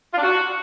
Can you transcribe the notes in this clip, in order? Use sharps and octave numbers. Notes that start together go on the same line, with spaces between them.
F4
D4
F#4